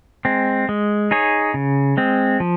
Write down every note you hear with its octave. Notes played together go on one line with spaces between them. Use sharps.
G#3 C4
G#3
D#4 G#4 C#5
C#3
G#3 C4
F3